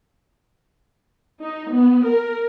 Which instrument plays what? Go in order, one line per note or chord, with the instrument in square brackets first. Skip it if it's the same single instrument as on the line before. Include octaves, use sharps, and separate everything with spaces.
[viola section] D#4
B3
A#4